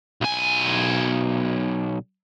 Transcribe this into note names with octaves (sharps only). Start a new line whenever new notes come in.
B1 G#5